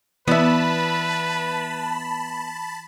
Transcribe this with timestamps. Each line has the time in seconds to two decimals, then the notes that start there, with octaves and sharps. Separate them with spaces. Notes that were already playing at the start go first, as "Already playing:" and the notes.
0.28 E3 B3 E4 B4 D5 E5 A5 B5